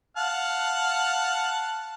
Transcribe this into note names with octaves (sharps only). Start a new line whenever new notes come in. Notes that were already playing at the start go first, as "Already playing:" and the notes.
F5 F#5 A5